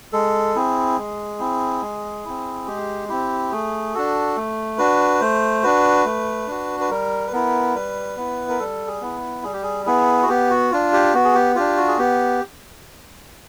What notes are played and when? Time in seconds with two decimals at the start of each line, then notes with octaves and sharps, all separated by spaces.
0.13 G#3 A4
0.55 C4 E4 G#4
0.98 G#3
1.40 C4 E4
1.82 G#3
2.25 C4 E4
2.67 G#3 G4
3.09 C4 E4 G4
3.51 A3 G#4
3.94 D4 F#4 A4
4.36 A3
4.78 D4 F#4 B4
5.21 A3 C5
5.63 D4 F#4 B4
6.05 A3
6.47 D4 F#4
6.80 B4
6.90 G3 A#4
7.27 B4
7.32 B3 E4 A#4
7.75 G3 B4
8.17 B3 E4
8.49 A#4
8.59 G3 A4
8.87 G#4
9.01 B3 E4
9.44 G3 G#4
9.53 G4
9.63 G#4
9.86 B3 E4 G#4
10.23 F#4
10.29 B3 G4
10.50 F#4
10.71 D4 F4
10.93 G4
11.14 B3 F#4
11.24 G#4
11.35 G4
11.55 D4 F4 G4
11.77 F#4
11.88 G#4
11.98 B3 G4